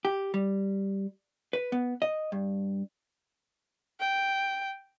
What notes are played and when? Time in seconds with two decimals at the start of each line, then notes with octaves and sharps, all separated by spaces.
0.05 G4
0.34 G3
1.53 B4
1.72 B3
2.02 D#5
2.32 G2
4.00 G5